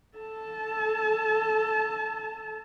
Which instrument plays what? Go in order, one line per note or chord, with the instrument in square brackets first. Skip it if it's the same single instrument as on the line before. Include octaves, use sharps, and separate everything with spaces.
[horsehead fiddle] A4 A5